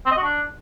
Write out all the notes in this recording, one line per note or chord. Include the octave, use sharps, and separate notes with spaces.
C4
D#5
F#4
D4